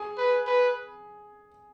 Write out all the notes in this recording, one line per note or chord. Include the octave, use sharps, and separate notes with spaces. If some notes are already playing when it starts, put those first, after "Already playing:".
Already playing: G#4 G#5
B4
B4